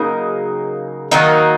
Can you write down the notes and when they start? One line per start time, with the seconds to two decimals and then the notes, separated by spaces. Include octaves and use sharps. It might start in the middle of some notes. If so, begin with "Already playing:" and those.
Already playing: C#3 F#3 A#3 D#4
1.11 D#3 F#3 A#3 D#4